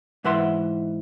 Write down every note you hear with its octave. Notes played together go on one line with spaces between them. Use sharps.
G#2 E3 B4 E5 F#5 C6